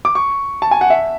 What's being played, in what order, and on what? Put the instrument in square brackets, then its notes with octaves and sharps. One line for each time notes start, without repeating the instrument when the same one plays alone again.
[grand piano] D6
C#6
A5
G#5
F#5
E5